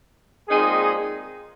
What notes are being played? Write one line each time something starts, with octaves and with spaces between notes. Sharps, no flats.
A#2 G#3 C4 D#4 G#4